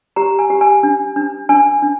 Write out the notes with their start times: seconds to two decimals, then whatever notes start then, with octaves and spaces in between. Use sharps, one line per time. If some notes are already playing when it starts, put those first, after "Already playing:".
0.16 G4 A#5
0.39 G#5
0.50 G4
0.61 G#5
0.83 D4
1.16 D4
1.49 D4 G#5
1.82 D4